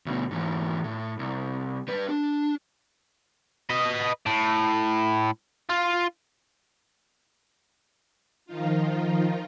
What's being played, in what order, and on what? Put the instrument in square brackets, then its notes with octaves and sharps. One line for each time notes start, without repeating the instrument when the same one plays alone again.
[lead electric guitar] D2 B2
G#2 E3
A2
C2
G3 B4
D4
[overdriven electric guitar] B4 D#5
A2
F4
[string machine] D#3 F3 D#4 F4